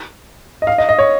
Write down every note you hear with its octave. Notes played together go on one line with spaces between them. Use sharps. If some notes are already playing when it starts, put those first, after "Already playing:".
D#5
F5
D#5
D#5
C#5